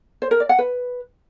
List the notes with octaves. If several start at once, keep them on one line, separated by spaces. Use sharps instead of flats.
C5
A#4
D5
F#5
B4